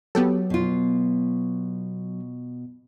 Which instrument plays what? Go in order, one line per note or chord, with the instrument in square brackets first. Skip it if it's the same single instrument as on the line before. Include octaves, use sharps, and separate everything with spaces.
[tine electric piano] F#3 [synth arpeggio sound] B3 G4 A4
[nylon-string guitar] B2 F4